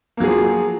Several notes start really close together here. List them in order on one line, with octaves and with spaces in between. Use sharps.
A#3 F#3 G#4 F3